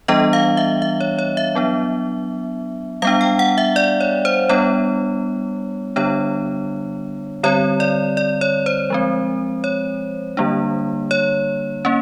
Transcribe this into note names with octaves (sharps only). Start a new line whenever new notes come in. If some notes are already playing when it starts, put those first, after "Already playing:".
E3 G3 B3 D4 D#5
F5
E5
E5
C#5
C#5
E5
F#3 B3 D4
G3 B3 D4 F5
G5
F#5
E5
D5
C#5
C5
G3 B3 D4 C#5
D3 G3 B3 D4 C#5
D3 G3 C4 C#5
D5
D5
C#5
C5
F3 G#3 C4
C#5
D3 G3 A#3 D4
C#5
A#3 C#4